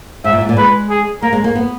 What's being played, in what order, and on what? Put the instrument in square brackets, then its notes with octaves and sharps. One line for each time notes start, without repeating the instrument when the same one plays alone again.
[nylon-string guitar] G#2 [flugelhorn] E5
[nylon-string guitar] A#2
G#2
A#2
[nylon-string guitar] G#3 [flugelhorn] B4
[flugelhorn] G#4
[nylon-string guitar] A#3 [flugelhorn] A#4
[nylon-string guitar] G#3
A#3
B3